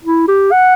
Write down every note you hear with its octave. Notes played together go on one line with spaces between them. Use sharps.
E4
G4
F#5